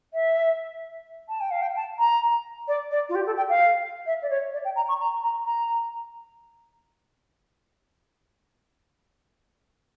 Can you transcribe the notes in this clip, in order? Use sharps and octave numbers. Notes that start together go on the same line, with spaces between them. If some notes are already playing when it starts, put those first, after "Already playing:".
E5
A5
G5
F5
G5
A5
A#5
D5
D5
F4
G4
A4
G5
F5
E5
D5
C#5
D5
G5
A#5
C#6
A#5
A#5
A#5